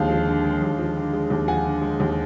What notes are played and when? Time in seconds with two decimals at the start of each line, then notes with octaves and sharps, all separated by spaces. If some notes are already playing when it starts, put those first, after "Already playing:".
Already playing: D#2 D3 F3 G#3 F5
0.10 F3
0.28 D3
0.45 G#3
0.62 D#2
0.78 F3
0.97 D3
1.13 G#3
1.30 D#2
1.48 F3 F#5 G#5
1.65 D3
1.82 G#3
2.00 D#2